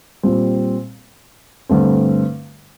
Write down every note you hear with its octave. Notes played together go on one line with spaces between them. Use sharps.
A#2 G3 C4
G2 D3 A3 C4